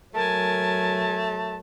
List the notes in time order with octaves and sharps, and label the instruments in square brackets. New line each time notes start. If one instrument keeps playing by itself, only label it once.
[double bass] F#3 [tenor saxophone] A3 [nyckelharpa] A#4 G#5 [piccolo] A5